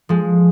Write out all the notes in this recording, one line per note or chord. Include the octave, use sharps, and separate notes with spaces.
F3 G#3